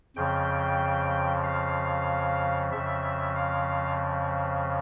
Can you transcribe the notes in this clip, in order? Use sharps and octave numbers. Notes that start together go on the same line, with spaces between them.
F2 C#3 F3 G5
F5
F2 C#3 F3 E5
F5